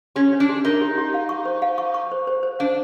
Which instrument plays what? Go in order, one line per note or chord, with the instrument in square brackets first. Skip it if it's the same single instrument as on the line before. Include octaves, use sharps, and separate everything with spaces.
[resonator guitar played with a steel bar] C#4 [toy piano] G4
[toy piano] C#5
[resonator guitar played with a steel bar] D4
[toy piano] G4
[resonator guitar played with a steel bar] D#4 [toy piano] A#4
[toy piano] G4
G4
F5
C#6
C5
F5
C#6
C#6
C5
C5
C5
[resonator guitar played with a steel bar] D4 [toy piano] F5